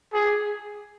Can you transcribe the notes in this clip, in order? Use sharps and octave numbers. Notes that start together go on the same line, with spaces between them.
G#4